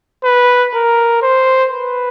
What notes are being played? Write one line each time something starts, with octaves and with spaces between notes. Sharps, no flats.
B4
A#4
C5
B4